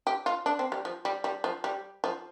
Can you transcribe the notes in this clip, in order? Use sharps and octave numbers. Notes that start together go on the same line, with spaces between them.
G4
F4
D4
C4
G3
F3
G3
G3
F3
G3
F3